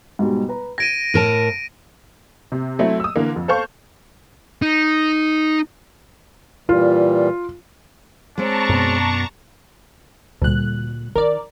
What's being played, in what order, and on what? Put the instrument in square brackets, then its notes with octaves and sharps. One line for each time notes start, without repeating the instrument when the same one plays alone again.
[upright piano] G#2 B2 G3
B4 A#5
[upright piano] G#6 [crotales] A#6 D7 D#7
[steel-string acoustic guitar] A2 A#4 A5
[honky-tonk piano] C3
F#3 A3 C4 E4
D#6 E6
D3 E3 A#3
F2
A4 C5 F5 C#6 G6
[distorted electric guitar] D#4
[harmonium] A#2 E3 G3 [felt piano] F4
[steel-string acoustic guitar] G#3 C4 C#5 [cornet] D4 [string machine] A5 A#5 C#6
[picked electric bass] F#2 B2 B3
[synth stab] D2 F#6 [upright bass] A#2 G3
[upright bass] D#3 D#4 [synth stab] A#4 D5